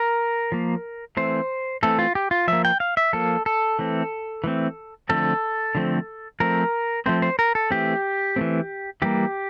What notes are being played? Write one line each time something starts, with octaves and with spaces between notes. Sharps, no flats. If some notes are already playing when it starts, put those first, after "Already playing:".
Already playing: A#4
F3 A#3
E3 A3 C4 C5
E3 A3 C4 A4
F4
G4
F4
F3 A#3 E5
G5
F5
E5
F3 A#3 A4
A4
E3 A3 C4
E3 A3 C4
D3 F3 A3 C4 A4
D3 F3 A3 C4
F3 A3 C4 A#4
F3 A3 C4 C5
C5
A#4
A4
E3 A3 C4 G4
E3 A3 C4
E3 G3 A#3 G4